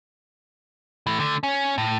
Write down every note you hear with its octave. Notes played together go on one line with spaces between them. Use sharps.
E3 A3
D3 A3
C#4
A2